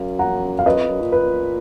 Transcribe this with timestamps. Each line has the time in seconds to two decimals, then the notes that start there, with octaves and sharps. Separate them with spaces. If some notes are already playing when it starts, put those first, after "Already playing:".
Already playing: F#2 F5
0.19 F#5 A#5
0.59 F5
0.66 F#2 B4 D#5
0.77 F2
0.89 F#2
1.01 A#2
1.12 B4